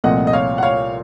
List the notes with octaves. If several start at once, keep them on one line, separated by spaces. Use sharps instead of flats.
C2 A#2 F3 A3 C4 D#5 F#5
D#5
C#5 F5
F#5
C#5 F5